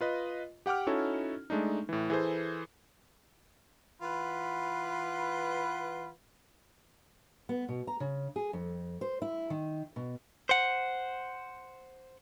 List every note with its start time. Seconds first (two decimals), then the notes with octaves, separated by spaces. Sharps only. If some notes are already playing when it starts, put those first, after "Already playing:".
0.01 F4 B4 D#5
0.66 G4 F#5 G5 D6 F6
0.87 C#4 D#4 E4 F#4 A4 C#5
1.50 G#3 A3 D4 D#4
1.89 A2 E3
2.10 E3 G#4 A4 C5
4.02 E3 F4 B4 F#5 B5
7.49 B3
7.69 B2
7.87 A#5
8.00 C#3
8.36 G#4
8.53 F2
9.01 C5
9.22 E4
9.50 D#3
9.96 B2
10.49 C5 F#5